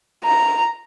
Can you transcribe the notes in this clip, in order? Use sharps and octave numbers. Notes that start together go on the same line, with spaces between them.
A#5